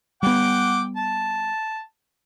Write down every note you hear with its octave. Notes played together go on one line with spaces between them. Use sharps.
G3 B3 F#5 G5 D6
A5